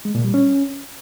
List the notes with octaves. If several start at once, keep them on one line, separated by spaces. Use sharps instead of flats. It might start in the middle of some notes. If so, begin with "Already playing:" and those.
G#3
A#2
G3
C#4